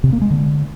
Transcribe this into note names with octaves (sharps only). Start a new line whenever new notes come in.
C3
A#3
G#3
D3